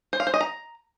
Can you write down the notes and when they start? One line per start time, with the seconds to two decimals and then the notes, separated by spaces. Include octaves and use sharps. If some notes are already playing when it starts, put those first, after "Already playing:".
0.13 C5
0.20 F5
0.27 C5
0.34 D#5
0.41 A#5